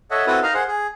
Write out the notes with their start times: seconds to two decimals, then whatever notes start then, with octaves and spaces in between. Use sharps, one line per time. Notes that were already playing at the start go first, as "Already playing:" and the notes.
0.11 A4 C#5 D#5 E5 F#5
0.27 C4 E4 F#4 A4 B4 D#6
0.43 D#4 A#4 D#5 F5
0.54 G#4 C5 F#5
0.68 G#4